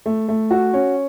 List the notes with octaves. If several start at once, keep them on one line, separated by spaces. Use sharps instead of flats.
A3
A3
F#4
C#4